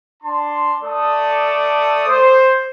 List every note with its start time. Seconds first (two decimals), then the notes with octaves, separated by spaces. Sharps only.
0.23 D4 A5 C6
0.82 A3 A4 D5 D#6
2.08 C5